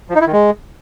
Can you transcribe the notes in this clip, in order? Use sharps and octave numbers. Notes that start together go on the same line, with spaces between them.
F3
D#4
E4
D#3
G#3